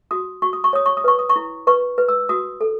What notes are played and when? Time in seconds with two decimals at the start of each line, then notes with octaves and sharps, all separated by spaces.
0.11 F#4 D#6
0.42 F#4 C#6
0.53 D#6
0.64 C#6
0.73 C#5 D#6
0.86 C#6
0.97 D#6
1.04 B4 C#6
1.19 D#6
1.29 C#6
1.36 E4
1.67 B4 C#6
1.98 B4
2.09 E6
2.29 F#4 D#6
2.61 A4